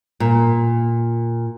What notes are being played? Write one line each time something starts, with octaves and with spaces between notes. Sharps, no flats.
A#2